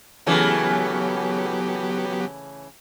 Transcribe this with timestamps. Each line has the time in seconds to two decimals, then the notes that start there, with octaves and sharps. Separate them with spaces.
0.26 C#3 E3 F#3 A3 B3 G4